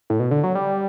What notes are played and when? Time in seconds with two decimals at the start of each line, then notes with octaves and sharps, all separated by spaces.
0.10 A2
0.19 B2
0.31 D3
0.44 F#3
0.55 G3